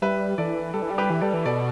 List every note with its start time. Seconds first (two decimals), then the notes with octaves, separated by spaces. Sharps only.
0.02 G3 B4 E5
0.38 E3 A4 D5
0.74 G3 A4
0.82 E3
0.90 G3
0.98 G4 B4
1.10 E3
1.21 G3 A4 D5
1.34 E3
1.45 B2 A4 D5